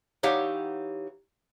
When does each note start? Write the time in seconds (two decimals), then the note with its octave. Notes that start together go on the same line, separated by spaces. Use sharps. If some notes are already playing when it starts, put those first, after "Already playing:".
0.23 E3 D#4 G4 C#5 F5 F#5